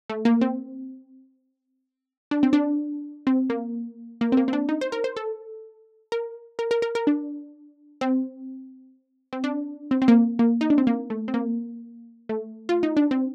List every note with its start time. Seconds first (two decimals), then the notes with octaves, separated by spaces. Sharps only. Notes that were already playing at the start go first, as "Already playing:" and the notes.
0.10 A3
0.25 A#3
0.41 C4
2.31 D4
2.43 C4
2.53 D4
3.27 C4
3.50 A#3
4.21 A#3
4.32 C4
4.37 A#3
4.48 C4
4.53 D4
4.69 D#4
4.81 C5
4.92 A#4
5.04 C5
5.17 A4
6.12 A#4
6.59 A#4
6.71 A#4
6.82 A#4
6.95 A#4
7.07 D4
8.01 C4
9.33 C4
9.44 D4
9.91 C4
10.02 C4
10.08 A#3
10.39 A#3
10.61 D#4
10.70 D4
10.78 C4
10.87 A#3
11.10 A3
11.28 C4
11.34 A#3
12.29 A3
12.69 F4
12.83 D#4
12.97 D4
13.11 C4